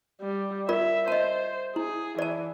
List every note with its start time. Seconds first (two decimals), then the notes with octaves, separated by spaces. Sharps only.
0.21 G3
0.69 F4 A#4 D5 E5
1.08 C5 D#5 A5
1.76 E4 G#4
2.19 E3 D5 A5